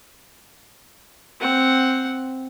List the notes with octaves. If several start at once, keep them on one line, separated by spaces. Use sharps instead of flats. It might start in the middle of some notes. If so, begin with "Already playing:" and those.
C4 F#5